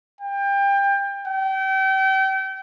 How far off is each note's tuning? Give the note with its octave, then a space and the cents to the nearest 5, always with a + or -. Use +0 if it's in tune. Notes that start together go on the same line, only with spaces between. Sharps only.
G5 +25
G5 -35